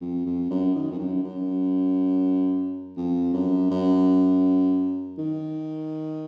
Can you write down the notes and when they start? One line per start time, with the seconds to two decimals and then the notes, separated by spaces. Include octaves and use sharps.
0.01 F2
0.26 F2
0.50 F#2
0.76 D#3
0.91 F2
0.99 F#2
1.24 F#2
2.97 F2
3.33 F#2
3.71 F#2
5.18 D#3